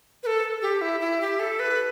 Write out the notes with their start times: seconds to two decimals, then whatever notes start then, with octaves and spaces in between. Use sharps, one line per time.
0.23 B4
0.27 A4
0.62 G4
0.81 E4
1.00 E4
1.21 G4
1.40 A4
1.60 B4